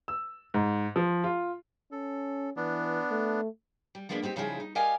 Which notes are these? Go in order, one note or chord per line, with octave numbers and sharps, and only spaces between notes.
E6
G#2
F3
F4
C#4 A4
E3 B3 D4
A3
G3
F3 G#3 A#3 B3 C#4 D4
B3 C4 D#4 G4
C#3 F3 G3 D#4 E4 G#4
D#4
G4 A#4 D5 D#5 F5 G#5